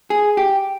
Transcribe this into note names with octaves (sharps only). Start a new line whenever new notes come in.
G#4
G4